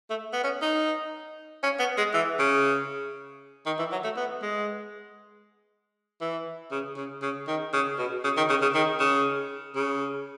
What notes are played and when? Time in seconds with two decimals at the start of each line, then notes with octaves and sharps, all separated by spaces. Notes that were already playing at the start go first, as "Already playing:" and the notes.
0.10 A3
0.33 B3
0.44 C#4
0.62 D#4
1.63 C#4
1.79 B3
1.98 G#3
2.14 E3
2.39 C#3
3.66 D#3
3.79 E3
3.92 F#3
4.04 A3
4.17 B3
4.43 G#3
6.21 E3
6.71 C#3
6.97 C#3
7.22 C#3
7.47 D#3
7.73 C#3
7.98 B2
8.24 C#3
8.37 D#3
8.50 C#3
8.62 C#3
8.75 D#3
9.00 C#3
9.76 C#3